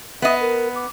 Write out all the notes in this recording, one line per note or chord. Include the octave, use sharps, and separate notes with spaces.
B3 D#5 E5
A#4
D6